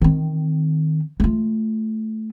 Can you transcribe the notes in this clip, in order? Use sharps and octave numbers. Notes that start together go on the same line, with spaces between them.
D#3 C4
A3 F4